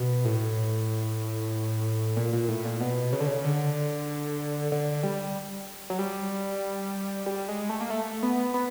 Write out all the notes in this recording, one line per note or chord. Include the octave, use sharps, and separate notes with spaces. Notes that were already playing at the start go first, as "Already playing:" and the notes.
Already playing: B2
A2
A#2
A#2
A2
A#2
B2
C#3
D3
C#3
D3
D3
G3
F#3
G3
G3
G#3
A3
A#3
A3
B3
B3